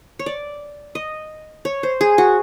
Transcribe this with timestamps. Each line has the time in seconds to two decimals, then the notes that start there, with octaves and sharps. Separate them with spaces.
0.19 C#5
0.26 D5
0.95 D#5
1.65 C#5
1.83 C5
2.01 G#4
2.18 F#4